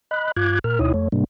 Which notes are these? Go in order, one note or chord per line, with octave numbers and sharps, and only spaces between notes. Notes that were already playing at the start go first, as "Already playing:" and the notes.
D#5 B5 F#6
G2 F4 D6 F#6 G#6
A#2 A#4 F6
D2 B2 D#4 E4 C#5 D#6
F2 A3 C#5
G#2 C3 G3 A#3 D4